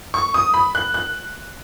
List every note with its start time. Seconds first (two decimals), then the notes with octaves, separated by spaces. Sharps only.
0.14 C#6
0.34 D#6
0.54 B5
0.75 F#6
0.94 F#6